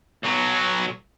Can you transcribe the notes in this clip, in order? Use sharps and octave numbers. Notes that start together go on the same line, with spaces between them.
B1 F#3